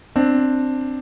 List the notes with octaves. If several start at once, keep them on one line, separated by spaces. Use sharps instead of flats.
C4 D4